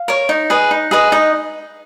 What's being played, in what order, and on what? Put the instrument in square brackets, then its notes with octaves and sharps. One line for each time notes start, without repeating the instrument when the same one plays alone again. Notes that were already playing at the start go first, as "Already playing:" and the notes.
Already playing: [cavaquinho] F5
A#4 C#5
D#4
G#4 B4 D#5
D#4
G#4 B4 D#5
D#4 D#5